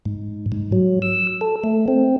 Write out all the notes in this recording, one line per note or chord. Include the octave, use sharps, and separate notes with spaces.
G#2
G#2
F#3
E6
A4
A3
C4